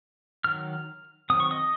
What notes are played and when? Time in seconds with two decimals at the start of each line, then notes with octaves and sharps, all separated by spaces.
0.44 D#3 F#3 F6
1.30 D#3 F#3 C4 D#6
1.40 C#6
1.51 D#5 D#6